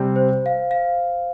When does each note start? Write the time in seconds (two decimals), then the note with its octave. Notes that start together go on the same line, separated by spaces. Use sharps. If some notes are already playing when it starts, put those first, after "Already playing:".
Already playing: C3 G3 C4
0.16 C5
0.46 F5
0.71 F5